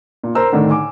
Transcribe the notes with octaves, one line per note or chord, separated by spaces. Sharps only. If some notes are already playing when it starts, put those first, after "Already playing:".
A#2
A#4 C5 A#5 E6
A2 D3 D#3 D4
G#5 D6